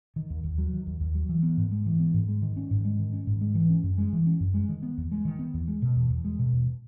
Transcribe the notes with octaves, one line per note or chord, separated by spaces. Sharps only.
D#3
D#2
D#2
F#3
D#3
D#2
D#2
F#3
E3
B3
G#2
G#3
E3
B3
G#2
G#3
D#3
C#4
G#2
G#3
D#3
C#4
G#2
G#3
E3
C#4
F#2
G#3
E3
C#4
F#2
G#3
D#3
B3
E2
G#3
D#3
B3
E2
G#3
B2
E2
E2
G#3
B2
E2